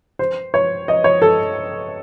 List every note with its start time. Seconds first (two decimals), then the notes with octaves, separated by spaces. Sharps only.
0.19 C5
0.54 C#5
0.88 D#5
1.04 C#5
1.22 A4